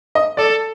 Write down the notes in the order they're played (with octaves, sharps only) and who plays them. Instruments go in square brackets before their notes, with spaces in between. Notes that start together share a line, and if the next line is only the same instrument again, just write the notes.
[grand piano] D#5
[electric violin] A4 [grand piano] D5